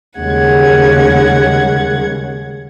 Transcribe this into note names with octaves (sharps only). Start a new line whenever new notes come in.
D#2 C#3 G3 G#3 F#5 G#6